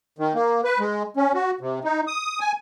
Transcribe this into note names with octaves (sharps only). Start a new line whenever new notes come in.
D#3
A#3
B4
G#3
C#4
F#4
C3
D#4
D#6
G#5